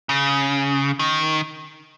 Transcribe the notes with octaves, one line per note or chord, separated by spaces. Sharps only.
C#3
D#3